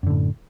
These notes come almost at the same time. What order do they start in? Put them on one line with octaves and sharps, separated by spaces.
F#2 D3 A2